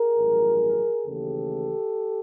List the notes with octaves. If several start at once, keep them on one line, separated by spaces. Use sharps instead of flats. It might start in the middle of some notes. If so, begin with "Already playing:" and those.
Already playing: G#4 A#4
A1 G2 D#3 F#3
D#2 C#3 E3 A3 G4 A4